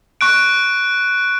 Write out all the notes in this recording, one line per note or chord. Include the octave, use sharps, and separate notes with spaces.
C#6 F#6 D7